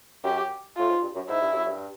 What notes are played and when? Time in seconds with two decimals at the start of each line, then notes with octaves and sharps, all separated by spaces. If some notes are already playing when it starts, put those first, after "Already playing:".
0.23 F#2 G4
0.76 A2 F4
0.89 G#2
1.02 G2
1.15 F#2
1.28 G#2 E4
1.42 G2
1.54 F#2
1.66 G2